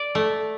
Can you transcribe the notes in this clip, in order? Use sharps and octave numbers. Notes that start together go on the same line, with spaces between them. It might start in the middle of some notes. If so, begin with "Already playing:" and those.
Already playing: D5
A3